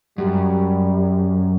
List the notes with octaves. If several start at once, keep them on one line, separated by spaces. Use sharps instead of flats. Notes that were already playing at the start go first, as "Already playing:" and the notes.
F#2 G3